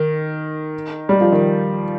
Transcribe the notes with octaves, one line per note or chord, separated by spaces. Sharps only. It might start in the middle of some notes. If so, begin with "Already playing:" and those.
Already playing: D#3
G3
F3
D#3